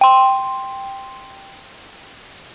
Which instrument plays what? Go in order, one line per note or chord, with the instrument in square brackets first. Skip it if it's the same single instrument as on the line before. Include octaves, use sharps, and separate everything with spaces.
[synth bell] G5 C6